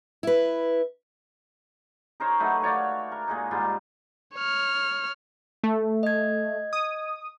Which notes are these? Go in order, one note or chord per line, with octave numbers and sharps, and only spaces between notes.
E4 B4
D#4 A#4 C5 C#5
F#3 A3 D#4 B4
F#4 C#5 D5 F5
A#4
A#2 G#3 D#4
G#2 G3 F4
C#5 F6
A3
D#5 G#6
D#6